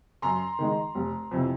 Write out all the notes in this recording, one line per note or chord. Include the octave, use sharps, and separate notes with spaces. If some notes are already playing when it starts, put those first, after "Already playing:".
F#2 A#5 C6
D#3 G#3
F1
F2 C3 E3